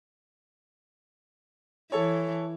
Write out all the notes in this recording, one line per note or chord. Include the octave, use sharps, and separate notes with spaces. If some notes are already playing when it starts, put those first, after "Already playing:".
E3 A4 C#5